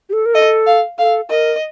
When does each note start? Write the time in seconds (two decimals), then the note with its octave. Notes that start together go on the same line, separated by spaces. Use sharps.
0.09 G4
0.13 A4
0.26 A#4
0.34 A4 D#5
0.66 F5
0.98 A4 F5
1.30 A#4 D#5